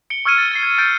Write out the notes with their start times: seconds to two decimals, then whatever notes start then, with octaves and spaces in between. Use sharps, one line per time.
0.10 C#7 D7 G7
0.25 C#6 E6 F6 G#6 C#7 D#7
0.38 A6 D#7
0.52 A6 C7
0.63 G#6
0.78 G6 A6 D7 D#7